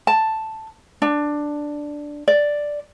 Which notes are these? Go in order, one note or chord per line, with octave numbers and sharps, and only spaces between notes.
A5
D4
D5